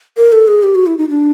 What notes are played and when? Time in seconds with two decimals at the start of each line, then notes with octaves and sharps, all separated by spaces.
0.17 A#4
0.32 A4
0.48 G#4
0.63 G4
0.75 F#4
0.86 E4
0.98 D#4
1.10 D4